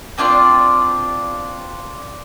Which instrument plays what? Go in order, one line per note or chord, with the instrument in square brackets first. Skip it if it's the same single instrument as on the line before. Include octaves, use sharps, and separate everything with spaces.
[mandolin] C4 D4 F4 D5